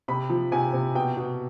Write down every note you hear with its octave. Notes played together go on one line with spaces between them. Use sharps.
C3 B5
F3
C3 G#5
C3
B2 G5
B2